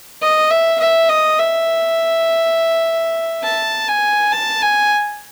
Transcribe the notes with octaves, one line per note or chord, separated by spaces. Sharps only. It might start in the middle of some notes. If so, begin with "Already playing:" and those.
D#5
E5
E5
D#5
E5
A5
G#5
A5
G#5